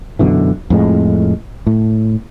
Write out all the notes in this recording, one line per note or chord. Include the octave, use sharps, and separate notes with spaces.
F#2 B2 D3 E3
F2 A2 G#3
A2